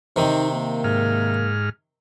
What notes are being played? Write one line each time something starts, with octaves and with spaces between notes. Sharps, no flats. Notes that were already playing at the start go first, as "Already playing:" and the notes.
C3 D#3 C4 D#4
A#3
G#2 F6